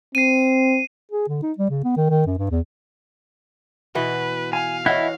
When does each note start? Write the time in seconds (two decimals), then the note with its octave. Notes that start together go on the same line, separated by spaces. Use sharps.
0.15 C4 C7 D#7
1.11 G#4
1.29 D3
1.43 D#4
1.58 G3
1.70 C#3
1.84 B3
1.96 D#3
2.10 D#3
2.26 F#2
2.38 G2
2.50 E2
3.95 B2 E3 F#4 B4
4.53 F5 G#5
4.86 E3 C#4 E4 C#5 D#5 F#5